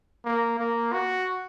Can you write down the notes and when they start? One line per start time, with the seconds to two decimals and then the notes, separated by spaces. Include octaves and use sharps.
0.25 A#3
0.59 A#3
0.93 F#4